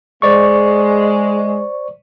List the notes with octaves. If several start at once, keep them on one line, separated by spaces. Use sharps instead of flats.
G#3 C5 D5 C#6